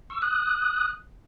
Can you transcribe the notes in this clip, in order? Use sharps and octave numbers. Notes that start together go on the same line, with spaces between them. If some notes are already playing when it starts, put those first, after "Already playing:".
C#6 E6
D#6 F#6